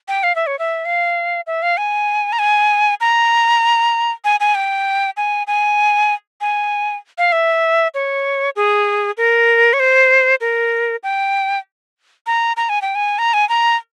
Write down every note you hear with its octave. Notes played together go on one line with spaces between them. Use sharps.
G5
F5
E5
C#5
E5
F5
E5
F5
G#5
A#5
G#5
A#5
G#5
G#5
G5
G#5
G#5
G#5
F5
E5
C#5
G#4
A#4
C#5
C5
A#4
G5
A#5
A#5
G#5
G5
G#5
A#5
G#5
A#5